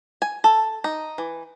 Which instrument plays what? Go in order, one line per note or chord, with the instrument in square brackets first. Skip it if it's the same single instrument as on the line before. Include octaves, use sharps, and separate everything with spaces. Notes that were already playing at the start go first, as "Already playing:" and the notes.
[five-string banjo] G#5
A4
D#4
E3